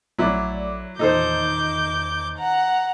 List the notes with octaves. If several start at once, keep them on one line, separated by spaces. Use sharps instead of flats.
A#1 F#3 A3 E4 D5
E2 A#2 D#3 D#4 A4 C5 D6 G6
F#5 A#5